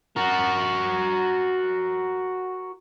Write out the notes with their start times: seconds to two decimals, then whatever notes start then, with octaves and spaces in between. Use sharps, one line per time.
0.17 F#4 A#4